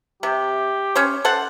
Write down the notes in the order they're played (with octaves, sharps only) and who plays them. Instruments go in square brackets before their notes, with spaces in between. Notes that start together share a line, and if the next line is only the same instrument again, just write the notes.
[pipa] C3 [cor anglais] G4
[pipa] C#4 C5 C#5
A4 C5 F#5